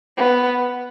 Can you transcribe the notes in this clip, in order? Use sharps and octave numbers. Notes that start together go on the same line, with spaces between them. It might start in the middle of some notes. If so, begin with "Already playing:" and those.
B3